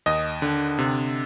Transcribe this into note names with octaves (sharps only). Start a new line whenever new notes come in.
D#2 D#5
D3
C3